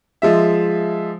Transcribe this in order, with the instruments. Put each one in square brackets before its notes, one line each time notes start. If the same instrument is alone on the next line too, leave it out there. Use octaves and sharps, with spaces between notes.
[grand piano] F3 G#3 E5